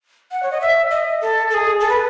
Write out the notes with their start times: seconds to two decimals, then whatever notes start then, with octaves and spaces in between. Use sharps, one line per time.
0.31 F#5
0.43 C#5
0.52 D#5
0.61 E5
0.91 D#5
1.21 A4
1.50 A4
1.54 G#4
1.80 A4
1.89 B4